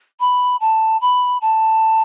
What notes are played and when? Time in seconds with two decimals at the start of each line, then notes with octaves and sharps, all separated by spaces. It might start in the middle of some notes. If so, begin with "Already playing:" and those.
0.20 B5
0.60 A5
1.01 B5
1.41 A5